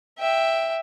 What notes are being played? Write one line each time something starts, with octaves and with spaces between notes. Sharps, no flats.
E5 G5